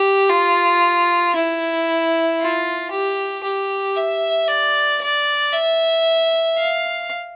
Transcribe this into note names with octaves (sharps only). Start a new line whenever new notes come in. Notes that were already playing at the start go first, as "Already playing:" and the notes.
Already playing: G4
F4
E4
F4
G4
G4
E5
D5
D5
E5
F5